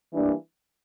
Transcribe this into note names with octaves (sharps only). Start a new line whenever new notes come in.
E3 G3 A#3 D4